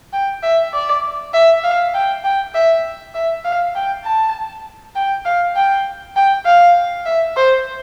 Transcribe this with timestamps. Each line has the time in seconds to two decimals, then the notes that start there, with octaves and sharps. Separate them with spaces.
0.13 G5
0.43 E5
0.73 D5
1.33 E5
1.64 F5
1.94 G5
2.24 G5
2.54 E5
3.14 E5
3.45 F5
3.75 G5
4.04 A5
4.95 G5
5.25 F5
5.56 G5
6.16 G5
6.45 F5
7.06 E5
7.37 C5